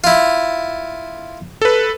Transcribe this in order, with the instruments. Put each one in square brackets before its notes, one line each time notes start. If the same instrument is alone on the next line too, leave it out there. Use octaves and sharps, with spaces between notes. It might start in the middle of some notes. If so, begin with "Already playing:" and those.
[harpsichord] E4 F4
[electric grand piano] A4 B4